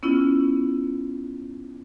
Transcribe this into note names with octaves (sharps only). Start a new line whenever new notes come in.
B3 C#4 E4 F4